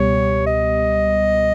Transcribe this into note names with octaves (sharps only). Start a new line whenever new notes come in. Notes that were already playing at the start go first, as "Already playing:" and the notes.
Already playing: C#2 B2 G3 B3 G4 C#5
D#5